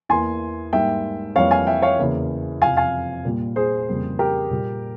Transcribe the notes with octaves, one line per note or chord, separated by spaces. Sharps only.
E2 E3 A#3 G#5 C6
G#2 G3 A#3 E5 G5
F2 E3 G3 A#3 C#5 F5
F5 G#5
E5 G5
C#5 F5
E2 C#3 E3 A#3
F2 C3 F3 F5 G#5
F5 G#5
A#2 G3 A#3
G#4 C5
F2 C#3 G3 A#3
G4 A#4
A#2 G3 A#3